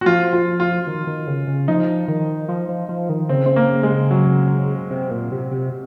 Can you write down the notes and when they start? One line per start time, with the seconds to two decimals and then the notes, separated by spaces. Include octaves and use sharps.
0.01 F#4
0.06 F3 F4
0.33 F4
0.60 F4
0.87 D#3
1.07 D#3
1.27 C#3
1.47 C#3
1.68 F3 D#4
2.08 D#3
2.49 F3
2.69 F3
2.89 F3
3.09 D#3
3.29 C#3 C4
3.46 C4
3.56 A#3
3.83 G#3
4.11 F#3
4.91 C3
5.11 A#2
5.32 C3
5.51 C3